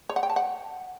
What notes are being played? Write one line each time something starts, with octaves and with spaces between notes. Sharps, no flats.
C#5
F#5
G5
A5
F#5